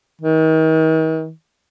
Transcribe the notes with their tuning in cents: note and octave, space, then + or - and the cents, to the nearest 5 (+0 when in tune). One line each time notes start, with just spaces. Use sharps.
D#3 +40